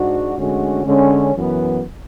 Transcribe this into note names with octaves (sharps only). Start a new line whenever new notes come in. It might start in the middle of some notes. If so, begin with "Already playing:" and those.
Already playing: G#2 G#3 D4 F#4
D2 D3 G#3 C#4 F#4
D3 G#3 C#4
F#2 E3 B3